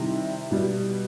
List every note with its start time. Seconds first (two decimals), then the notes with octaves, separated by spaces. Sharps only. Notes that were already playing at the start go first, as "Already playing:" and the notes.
Already playing: C3 D#3 G3 E4
0.51 B2 G3